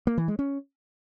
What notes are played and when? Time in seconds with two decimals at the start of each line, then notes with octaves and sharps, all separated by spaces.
0.07 A#3
0.18 E3
0.28 G#3
0.39 C#4